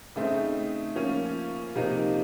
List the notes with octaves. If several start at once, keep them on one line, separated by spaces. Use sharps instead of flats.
C#3 A3 C4 D#4
F3 A#3 C#4
C3 F3 A#3 D#4